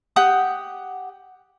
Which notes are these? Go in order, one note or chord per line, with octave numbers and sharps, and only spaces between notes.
G4 F#5 G5 D#6